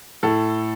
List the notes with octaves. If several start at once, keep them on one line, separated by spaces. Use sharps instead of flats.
A2 A4